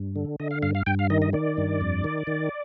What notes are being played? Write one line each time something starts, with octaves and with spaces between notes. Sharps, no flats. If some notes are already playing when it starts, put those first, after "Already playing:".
Already playing: G2
D3
D3 D#5
F5
G2 F5
F5
G2 G5
F5
D#3 D#5
D#5
D#3 D5
G2
F2
D#3
D#3